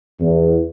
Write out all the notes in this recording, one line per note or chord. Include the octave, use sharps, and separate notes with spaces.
E2